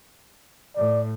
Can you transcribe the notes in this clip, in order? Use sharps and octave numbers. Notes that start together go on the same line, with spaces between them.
A2 D5